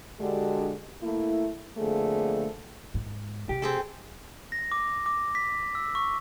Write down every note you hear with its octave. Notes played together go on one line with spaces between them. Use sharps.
D3 G#3 D4 F#4 G4
A3 A#3 E4
F2 D3 A3 A#3 G#4
G#2
C3 G4
C4 G#4 A4
A#6
D6
D6
B6
E6
C#6